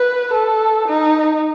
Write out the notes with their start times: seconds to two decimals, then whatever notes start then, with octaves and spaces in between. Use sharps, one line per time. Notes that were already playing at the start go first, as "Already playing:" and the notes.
Already playing: B4
0.33 A4
0.88 D#4